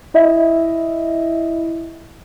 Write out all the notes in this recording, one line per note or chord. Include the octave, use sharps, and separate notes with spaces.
E4 D#5 E5